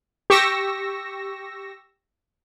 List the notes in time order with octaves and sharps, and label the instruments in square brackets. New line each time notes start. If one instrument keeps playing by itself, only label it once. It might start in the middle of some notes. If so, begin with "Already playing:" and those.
[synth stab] G4 C#6 E6 A#6